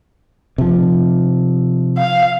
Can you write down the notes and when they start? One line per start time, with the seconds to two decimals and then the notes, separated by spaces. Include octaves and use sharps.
0.58 C3 F3
1.98 F5